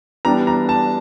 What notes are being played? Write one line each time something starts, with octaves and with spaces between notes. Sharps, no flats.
E3 G3 B3 D4 A#5
A#5
A5